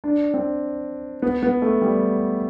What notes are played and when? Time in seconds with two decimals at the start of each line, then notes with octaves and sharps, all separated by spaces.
0.04 D4
0.34 C4
1.22 B3
1.43 B3
1.62 A3
1.82 G3